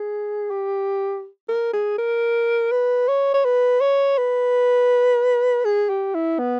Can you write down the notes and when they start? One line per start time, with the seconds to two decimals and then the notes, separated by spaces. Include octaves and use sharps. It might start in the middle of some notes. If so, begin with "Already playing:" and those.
Already playing: G#4
0.50 G4
1.48 A#4
1.73 G#4
1.98 A#4
2.71 B4
3.08 C#5
3.34 C#5
3.45 B4
3.81 C#5
4.18 B4
5.65 G#4
5.89 G4
6.14 E4
6.39 B3